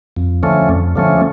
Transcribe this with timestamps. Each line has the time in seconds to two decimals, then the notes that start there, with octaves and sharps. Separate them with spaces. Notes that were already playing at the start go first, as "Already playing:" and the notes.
0.16 F2
0.43 D3 F3 A3 C#4
0.69 F2
0.96 D3 F3 A3 C#4